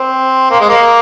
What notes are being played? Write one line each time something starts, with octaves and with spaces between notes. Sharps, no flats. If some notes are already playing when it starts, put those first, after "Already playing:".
Already playing: C4
A#3
G#3
A#3